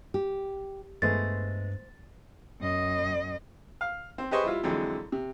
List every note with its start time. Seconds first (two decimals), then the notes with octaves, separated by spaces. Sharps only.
0.14 G4
1.02 G2 G#3 A3 B3 C5 A6
2.61 F#2 D#5
3.81 F5
4.18 C4
4.31 G4 G#4 B4 C5 D#5 C#6
4.44 G3 E4 F4
4.63 F2 D3 E3 F#3 G#3
5.12 C3